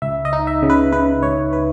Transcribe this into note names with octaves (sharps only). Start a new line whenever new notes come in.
C#2 E5
D#5
D#4
E5
C#3
B4
C#3 B4
C#2 C#5
B4